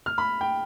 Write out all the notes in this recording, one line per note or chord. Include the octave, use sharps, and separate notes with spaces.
F6
B5
G5